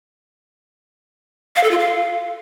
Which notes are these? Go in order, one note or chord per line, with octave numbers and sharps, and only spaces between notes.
F5
A4
F4
F5